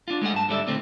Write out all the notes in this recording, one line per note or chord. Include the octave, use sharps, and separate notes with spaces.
D4 F4
G#3 A3 G#4 F#5
G2 A5
G#2 D3 G3 A4 D5 E5
A#2 D3 A3 C4